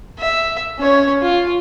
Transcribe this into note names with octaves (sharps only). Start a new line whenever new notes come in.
E5
C#4 C#5
F4